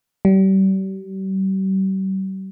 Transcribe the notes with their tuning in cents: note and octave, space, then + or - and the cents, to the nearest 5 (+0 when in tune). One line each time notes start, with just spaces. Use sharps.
G3 -40